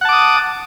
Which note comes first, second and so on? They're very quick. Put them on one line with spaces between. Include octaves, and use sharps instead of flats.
F#5 A5 D6 D#6